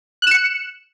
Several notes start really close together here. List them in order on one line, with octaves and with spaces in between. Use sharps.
F#6 E7 C#7